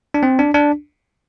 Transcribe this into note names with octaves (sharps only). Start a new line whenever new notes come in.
D4
C4
D4
D4